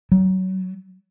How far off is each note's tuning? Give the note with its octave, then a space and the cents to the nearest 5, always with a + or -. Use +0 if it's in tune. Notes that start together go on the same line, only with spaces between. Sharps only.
F#3 +25